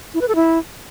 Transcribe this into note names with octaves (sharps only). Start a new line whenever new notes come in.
E4
B4
A4
E4